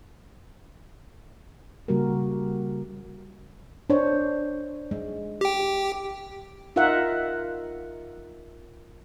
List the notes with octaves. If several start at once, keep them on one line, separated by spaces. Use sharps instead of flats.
C#3 G3 A#3 F#4 G4 A#4
D4 C5 C#5
G#3
G4 G5
D#4 F4 A#4 E5 F#5